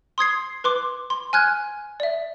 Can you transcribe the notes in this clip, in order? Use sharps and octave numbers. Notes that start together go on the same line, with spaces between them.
C6 D#6 G#6 C7
B4 C6 D6
C6
G#5 F6 F#6 G#6
D5 E5